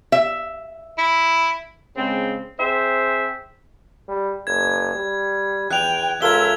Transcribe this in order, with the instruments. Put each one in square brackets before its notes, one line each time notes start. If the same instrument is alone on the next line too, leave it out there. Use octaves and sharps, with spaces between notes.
[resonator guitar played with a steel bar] E5
[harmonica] E4
[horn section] C#3 G#3 C4
C4 G#4 C5 E5 G5
[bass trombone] G3
[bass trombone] F#1 [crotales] G#6
[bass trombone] G3
[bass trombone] E2 [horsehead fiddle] G5 [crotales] F#6 F7
[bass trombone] C#2 [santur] F4 A4 A#4 [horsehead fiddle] E5 [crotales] G#6 G7